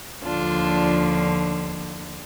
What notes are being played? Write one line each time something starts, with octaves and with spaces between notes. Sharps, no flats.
D#2 D3 F3 D4 F4